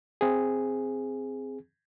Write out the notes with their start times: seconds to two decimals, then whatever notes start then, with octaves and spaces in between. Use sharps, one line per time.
0.21 C4 G#4